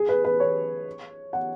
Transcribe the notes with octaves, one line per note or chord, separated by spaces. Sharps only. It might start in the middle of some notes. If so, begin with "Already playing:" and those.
Already playing: G#4
B4
B4
C#5
F#5